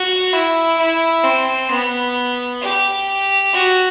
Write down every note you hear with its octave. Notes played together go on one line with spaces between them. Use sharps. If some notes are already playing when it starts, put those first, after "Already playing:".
Already playing: F#4
E4
E4
C4
B3
G4
F#4